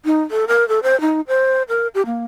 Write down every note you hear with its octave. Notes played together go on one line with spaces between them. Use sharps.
D#4
A4
A#4
A4
C5
D#4
C5
A#4
G4
A#3